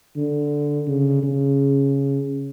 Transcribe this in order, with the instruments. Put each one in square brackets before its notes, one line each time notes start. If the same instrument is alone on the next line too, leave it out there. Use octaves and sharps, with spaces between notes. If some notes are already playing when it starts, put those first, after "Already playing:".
[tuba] D3
C#3
C#3